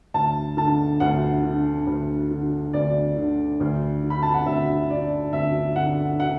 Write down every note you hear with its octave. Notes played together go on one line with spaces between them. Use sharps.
D2 A5
D3 A5
D2 F#5
D3
D2
D3
D2 D5
D3
D2
D3
B5
A5
F#5
D2 E5
D3 D5
D2 E5
D3 F#5
F#5